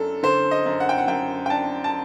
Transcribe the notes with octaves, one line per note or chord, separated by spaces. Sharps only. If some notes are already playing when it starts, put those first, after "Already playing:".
Already playing: F#2 D4 A4
D3 C5
D#5
F#2
F#5
G5
F#5
F#2 G5
G5
D4 A5
A5